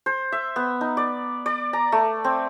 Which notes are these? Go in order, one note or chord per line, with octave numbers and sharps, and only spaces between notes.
C5
E5
B3
D#4
D5
D5
A#5
A3
C4